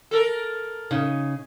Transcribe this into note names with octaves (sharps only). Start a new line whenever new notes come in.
A4 A#4
C#3 D#4